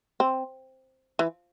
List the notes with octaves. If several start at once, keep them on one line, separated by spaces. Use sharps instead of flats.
C4
E3